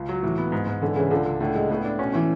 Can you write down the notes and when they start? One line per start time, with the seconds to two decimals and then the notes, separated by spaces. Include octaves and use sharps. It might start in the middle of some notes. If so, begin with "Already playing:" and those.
Already playing: C#2
0.09 F#3
0.23 A2 E3
0.38 B3
0.52 G#2
0.67 G#2
0.81 D3 E3
0.96 C#3 E3
1.11 C#2 D3
1.26 C#2
1.41 A2 D3
1.56 G#3
1.70 A2 B3
1.84 D4
1.99 B2 C#4
2.14 E3 C#4